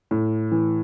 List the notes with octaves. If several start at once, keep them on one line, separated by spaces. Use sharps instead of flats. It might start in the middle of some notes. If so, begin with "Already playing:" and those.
A2
E3